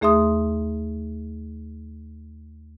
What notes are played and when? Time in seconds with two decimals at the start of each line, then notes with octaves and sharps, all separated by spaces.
0.01 D#2 A3 G#4 E5 C6 D#6